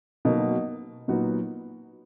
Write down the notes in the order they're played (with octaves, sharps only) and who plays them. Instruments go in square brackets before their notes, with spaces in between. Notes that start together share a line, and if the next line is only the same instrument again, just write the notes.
[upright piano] B2 F#3 A#3 D#4
A#2 F#3 B3 D#4 F#4